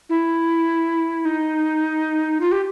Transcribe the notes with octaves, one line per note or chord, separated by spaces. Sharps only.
E4
D#4
F4
G4